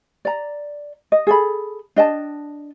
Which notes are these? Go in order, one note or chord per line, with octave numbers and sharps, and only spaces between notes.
D5 A#5
D#5
G#4 A4 B5
D4 D#5 G5 A5